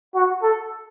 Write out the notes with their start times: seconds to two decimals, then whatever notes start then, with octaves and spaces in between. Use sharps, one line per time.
0.15 F#4
0.43 A4